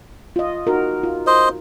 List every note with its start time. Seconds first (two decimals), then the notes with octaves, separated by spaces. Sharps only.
0.36 F4 D#5
0.67 D#4 F#4 A#4
1.03 F4
1.27 C5 D#5